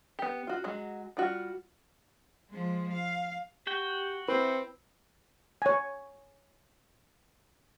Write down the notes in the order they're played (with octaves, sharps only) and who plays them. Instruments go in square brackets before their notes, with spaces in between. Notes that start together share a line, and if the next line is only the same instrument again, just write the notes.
[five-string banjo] B3 G4
F4 F#4
F#3 G#3 F#4
G3 F4 F#4
[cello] F3 G#3
F5
[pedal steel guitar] F#4 G5 [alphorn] G4
[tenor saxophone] C4 [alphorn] E4 [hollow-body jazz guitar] B4
[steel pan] C#5 G#5